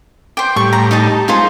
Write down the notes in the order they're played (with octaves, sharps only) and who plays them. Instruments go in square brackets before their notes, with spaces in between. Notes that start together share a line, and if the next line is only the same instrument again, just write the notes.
[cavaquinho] C5 G5 [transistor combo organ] D6
[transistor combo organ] A2 G3 [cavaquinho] C#6
[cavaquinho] A#5
D#4 D#5 A5
[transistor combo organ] G#3 [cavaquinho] D#4 F4 C5